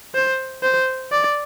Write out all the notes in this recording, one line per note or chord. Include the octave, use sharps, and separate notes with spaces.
C5
C5
D5